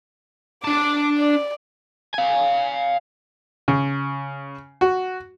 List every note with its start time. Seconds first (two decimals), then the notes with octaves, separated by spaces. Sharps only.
0.65 D4 A5 D6
1.19 D5
2.14 F5 G#5
3.68 C#3
4.81 F#4